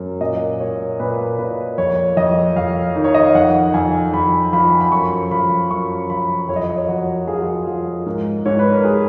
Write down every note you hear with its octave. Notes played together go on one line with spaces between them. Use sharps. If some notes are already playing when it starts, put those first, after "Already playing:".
Already playing: F#2
A#2 D#5
A#2 C#5
A#2 B4
A#2 B4
F2 C#5
F2 D#5
F2 F5
D#3
C#5
D#5
F5
F2 F#5
F2 G#5
F2 B5
F3 B5
B5
F#2 C#6
F3 B5
F#2 C#6
F3 B5
F2 C#5
D#5
C#5
D#5
C#5
F2 F#4
F3 G#4
F#4
F4
F#4
F3
G#2 A#4
G#2 C#5
B4
A#4
G#4